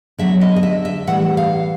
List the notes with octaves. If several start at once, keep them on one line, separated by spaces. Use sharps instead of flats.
D3 F#3 B3 E5
D#5
D#5
E5
E5
A2 E3 G3 F#5
F5